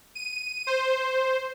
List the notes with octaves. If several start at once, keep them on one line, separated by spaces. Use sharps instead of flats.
D#7
C5